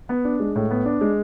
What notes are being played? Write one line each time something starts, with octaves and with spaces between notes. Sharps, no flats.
B3
D4
G#3
A2
B3
D4
G#3